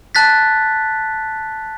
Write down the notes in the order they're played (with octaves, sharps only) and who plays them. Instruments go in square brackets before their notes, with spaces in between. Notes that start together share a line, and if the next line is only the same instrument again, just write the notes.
[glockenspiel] A5 F#6 A6 B6